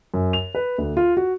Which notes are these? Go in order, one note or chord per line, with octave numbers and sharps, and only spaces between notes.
F#2
F7
B4
D2
F4
F#4